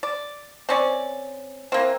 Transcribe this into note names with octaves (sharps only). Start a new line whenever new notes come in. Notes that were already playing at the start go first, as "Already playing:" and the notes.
D5
C4 C#4 D5
E3 A#3 C4